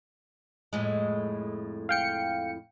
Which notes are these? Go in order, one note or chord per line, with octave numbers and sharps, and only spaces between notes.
F2 A2 G#3
F5 G5 C#7